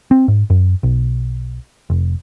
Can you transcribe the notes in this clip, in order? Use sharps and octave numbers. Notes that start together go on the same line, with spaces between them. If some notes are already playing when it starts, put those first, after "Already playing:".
C4
G#2
F#2
B1
F1